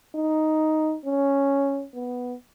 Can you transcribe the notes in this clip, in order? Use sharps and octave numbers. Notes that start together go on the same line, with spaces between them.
D#4
C#4
B3